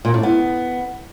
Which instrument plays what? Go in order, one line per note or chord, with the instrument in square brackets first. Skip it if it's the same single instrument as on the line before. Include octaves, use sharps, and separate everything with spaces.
[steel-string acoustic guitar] A#2
A2
B3